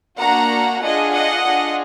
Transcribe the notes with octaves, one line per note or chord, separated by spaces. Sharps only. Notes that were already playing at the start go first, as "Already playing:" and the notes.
A#3 D4 F#4 F#5 A#5
D4 F4 G#4 D#5 F#5
D#5 F#5
D4 F4 G#4